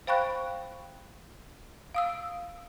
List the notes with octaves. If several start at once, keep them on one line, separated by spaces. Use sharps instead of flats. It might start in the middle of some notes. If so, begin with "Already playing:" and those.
C5 F5 G5 B5 C#6 F#6
F5 D#6 E6